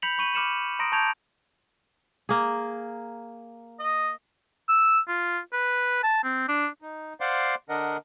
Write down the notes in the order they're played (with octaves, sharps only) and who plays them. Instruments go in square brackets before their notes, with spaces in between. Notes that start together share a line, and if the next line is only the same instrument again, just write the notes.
[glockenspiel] B5 G6 B6 C#7 F7 F#7
B5 C#6 D#7 F#7
B5 D6 F6 C#7 E7 F#7
A#5 C6 D#6 A#6 D7
A5 C#6 G6 G#6 D7 F7
[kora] A#3 G#4
[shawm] D#5
[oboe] E6
F4
B4
A5
C4
D4
[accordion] D#4
C5 D5 F5 F#5 C6 D6
D3 D4 A#4 D#5 F#5